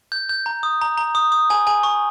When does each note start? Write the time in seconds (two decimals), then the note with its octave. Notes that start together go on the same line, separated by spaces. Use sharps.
0.12 G6
0.29 G6
0.46 A#5
0.63 D#6
0.82 A#5
0.97 A#5
1.15 D#6
1.32 D#6
1.50 G#5
1.67 G#5
1.83 C#6